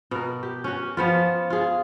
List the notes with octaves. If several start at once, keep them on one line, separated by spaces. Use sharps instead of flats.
B2 A#4
G4
C#4 F#4
F3 B3 F4
F4 G#4